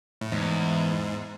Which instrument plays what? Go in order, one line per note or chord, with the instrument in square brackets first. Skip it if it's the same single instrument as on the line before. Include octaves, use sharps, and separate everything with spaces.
[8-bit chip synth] A2
[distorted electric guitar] E2 [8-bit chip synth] G#2